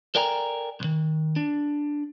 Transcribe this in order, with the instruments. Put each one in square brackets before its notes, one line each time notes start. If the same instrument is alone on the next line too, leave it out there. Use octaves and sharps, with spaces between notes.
[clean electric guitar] A4 A#4 D5 G5 G#5 A#5
B1 D#3
D4